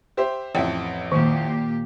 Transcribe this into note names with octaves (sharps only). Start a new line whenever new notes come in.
G4 C5 E5
A1 F2 E5 G5
A#2 D#3 A#3 G4